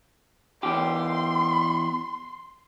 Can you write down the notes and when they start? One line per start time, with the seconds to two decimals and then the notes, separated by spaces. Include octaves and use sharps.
0.63 E2 G4 C6